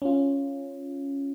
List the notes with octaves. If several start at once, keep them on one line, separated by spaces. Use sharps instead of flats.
C#4 F4